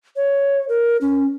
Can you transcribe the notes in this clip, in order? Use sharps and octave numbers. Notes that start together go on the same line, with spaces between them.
C#5
A#4
C#4